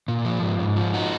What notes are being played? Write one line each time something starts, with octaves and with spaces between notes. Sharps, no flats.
A#2
F3
G#2
G#2
F3
D#4 F#4